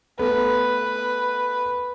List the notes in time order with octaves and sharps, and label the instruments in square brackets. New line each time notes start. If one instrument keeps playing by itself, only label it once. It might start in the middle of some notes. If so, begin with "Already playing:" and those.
[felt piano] A3 B3 [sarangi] B4